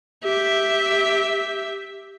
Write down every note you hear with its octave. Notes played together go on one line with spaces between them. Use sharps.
G4 E5